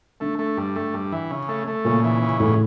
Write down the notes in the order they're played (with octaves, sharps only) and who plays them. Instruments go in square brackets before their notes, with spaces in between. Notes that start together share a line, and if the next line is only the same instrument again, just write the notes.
[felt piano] D3 [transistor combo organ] A3
[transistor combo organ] A3
G2
A3
G2
E3
C#3
A3
A3
[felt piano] A#2 [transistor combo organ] C#3
[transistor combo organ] E3
C#3
[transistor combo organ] E2 [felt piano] A2